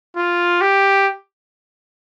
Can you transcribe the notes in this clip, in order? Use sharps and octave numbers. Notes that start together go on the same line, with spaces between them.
F4
G4